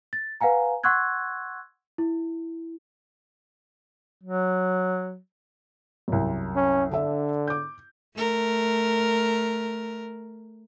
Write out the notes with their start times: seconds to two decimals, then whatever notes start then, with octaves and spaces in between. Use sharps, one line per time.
0.13 A6
0.41 B4 F5 F#5 G#5 A#5
0.84 F#5 C6 C#6 E6 F#6 G#6
1.98 E4
4.23 F#3
6.08 C2 F#2
6.56 C#4
6.91 D3 D4 E5
7.47 D6 G6
8.16 A3 A#4